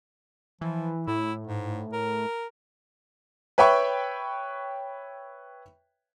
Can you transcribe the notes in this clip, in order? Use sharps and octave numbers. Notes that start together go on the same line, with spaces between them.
E3 F3
A2 E4
G#2
A#4
B4 C#5 E5 G5 B5 C#6